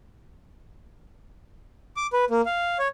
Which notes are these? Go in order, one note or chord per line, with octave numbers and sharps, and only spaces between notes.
D6
B4
A#3
F5
C#5